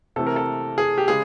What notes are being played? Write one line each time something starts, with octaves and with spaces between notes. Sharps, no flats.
C3 E3 A3 A4
A#4
A4
G#4
G4
C#3 G#3 G#4